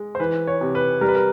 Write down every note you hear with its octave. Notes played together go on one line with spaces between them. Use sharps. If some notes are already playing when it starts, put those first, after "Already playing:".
Already playing: G#3
C5
E3 B4
C#5
C3
B4
G3 A#4
B4
A#4